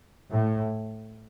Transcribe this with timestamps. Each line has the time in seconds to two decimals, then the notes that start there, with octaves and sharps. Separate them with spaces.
0.31 A2